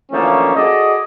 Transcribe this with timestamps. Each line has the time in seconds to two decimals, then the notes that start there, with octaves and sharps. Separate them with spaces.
0.12 D3 E3 F3 A3 A#3 C#4
0.54 F#4 G#4 A4 D5 D#5